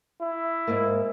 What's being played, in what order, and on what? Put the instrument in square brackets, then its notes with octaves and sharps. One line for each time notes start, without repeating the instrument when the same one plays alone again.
[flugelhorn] E4
[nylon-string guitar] G#2 A#3